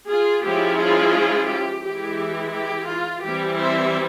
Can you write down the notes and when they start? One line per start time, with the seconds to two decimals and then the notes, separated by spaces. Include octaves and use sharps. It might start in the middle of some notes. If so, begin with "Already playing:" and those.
0.09 F4 G#4
0.44 F3 G#3 C#4 E4 G4
0.79 F4 G#4
1.49 G4
1.84 E3 G#3 E4 G4
2.54 G4
2.88 F4
3.23 E3 G3 C4 E4 G4
3.58 C5 E5